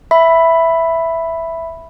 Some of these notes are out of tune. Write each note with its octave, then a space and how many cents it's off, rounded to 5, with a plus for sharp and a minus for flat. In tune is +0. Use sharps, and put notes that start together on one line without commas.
E5 +0 B5 +0